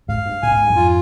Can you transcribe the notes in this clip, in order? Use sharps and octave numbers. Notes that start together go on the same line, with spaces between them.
G#2 C3 F5
G2
A#2 G#5
G#2
G2
F2 G#2
F4